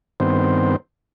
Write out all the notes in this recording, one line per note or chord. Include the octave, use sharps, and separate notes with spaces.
G2 D#3 B3 C4 C5